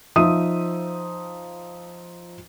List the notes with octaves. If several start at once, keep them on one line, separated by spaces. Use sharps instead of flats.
F3 D#4 E5 D#6 D#7